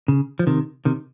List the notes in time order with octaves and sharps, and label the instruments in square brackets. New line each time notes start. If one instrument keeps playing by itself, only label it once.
[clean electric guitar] C#3
F3
C3 D#3
C3 D#3